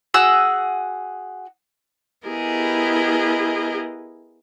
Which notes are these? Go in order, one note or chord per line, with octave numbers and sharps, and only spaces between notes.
F#4 G#4 F#5 E6
B3 E4 G4 G#4 A#4 D#5